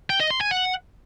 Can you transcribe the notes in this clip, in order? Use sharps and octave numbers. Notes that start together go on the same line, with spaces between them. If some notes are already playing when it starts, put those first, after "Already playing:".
G5
D#5
C6
G#5
F#5